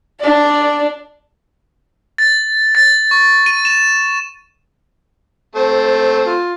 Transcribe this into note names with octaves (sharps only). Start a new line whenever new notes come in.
D4 D5
A6
A6
C#6
D#7
E7
A3 C4 C5
F4